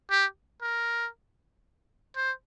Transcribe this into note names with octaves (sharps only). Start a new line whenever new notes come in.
G4
A#4
C5